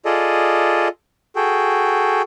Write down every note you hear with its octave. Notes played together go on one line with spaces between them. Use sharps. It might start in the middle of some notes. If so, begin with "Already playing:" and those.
F4 G#4 A4 D5 D#5
F#4 G#4 A4 G5